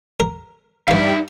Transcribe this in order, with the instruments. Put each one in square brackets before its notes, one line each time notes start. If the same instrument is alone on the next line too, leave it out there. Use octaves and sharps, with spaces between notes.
[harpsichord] A#4
[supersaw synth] G2 G3 [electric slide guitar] D#4 E5 [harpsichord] B4 F5